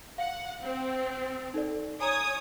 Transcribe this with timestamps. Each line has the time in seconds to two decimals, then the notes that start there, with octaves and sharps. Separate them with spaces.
0.18 F5 F#5
0.62 C4
1.54 D#4 A4 D5
2.01 C#5 G#5 A#5 D#6 G#6